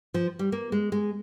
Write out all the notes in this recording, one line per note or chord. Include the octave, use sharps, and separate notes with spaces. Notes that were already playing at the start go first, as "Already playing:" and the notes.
F3
G3
A#3
G#3
G#3